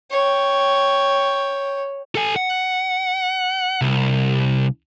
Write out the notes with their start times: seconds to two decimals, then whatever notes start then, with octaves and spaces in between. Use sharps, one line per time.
0.11 C#5 G5
2.15 A4 G#5
2.36 F#5
3.81 C2